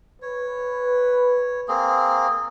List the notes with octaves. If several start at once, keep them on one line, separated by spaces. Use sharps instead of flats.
B4 C#5
A#3 C4 G#4